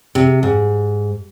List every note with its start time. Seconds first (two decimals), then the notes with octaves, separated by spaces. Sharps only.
0.15 C3
0.43 G#2